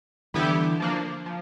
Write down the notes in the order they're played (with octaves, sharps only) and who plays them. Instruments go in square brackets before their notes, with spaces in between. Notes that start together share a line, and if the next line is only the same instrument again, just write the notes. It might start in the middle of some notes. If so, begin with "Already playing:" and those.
[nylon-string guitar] D3 E3 [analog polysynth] G3 B3 E4 G4
[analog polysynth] F3 A#3 D4
F3